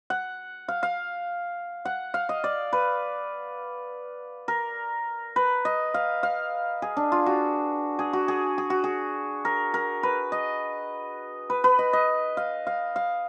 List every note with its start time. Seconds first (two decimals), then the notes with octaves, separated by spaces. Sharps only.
0.10 F#5
0.68 F5
0.83 F5
1.85 F#5
2.14 F5
2.29 D#5
2.44 D5
2.73 B4
4.48 A#4
5.36 B4
5.65 D#5
5.94 F5
6.23 F5
6.82 G#4
6.97 D4
7.12 F4
7.26 F#4
7.99 G#4
8.13 F#4
8.28 G#4
8.58 G#4
8.70 F#4
8.84 G#4
9.45 A#4
9.74 A#4
10.03 B4
10.32 D#5
11.50 B4
11.64 B4
11.79 D#5
11.93 D#5
12.37 F5
12.67 F5
12.96 F5